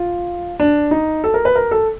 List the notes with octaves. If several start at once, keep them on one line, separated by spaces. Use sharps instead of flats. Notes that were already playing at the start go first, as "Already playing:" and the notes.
Already playing: F4
D4
D#4
A4
A#4
B4
A#4
A4